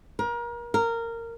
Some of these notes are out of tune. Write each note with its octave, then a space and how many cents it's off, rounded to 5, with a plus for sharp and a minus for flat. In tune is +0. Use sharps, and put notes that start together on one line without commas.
A#4 +30
A#4 -15